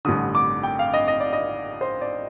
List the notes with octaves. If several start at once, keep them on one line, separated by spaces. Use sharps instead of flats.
A1 G2 D3 D#6
D6
G5
F5
D#5
D#5
D5
D#5
C5
D5